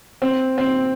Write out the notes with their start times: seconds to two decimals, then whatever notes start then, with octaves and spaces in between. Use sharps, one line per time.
0.22 C4
0.58 C4